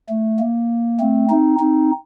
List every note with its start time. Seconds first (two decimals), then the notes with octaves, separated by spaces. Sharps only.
0.09 A3
0.39 A#3
1.00 A3 C4
1.30 C4 D#4
1.60 C4 D#4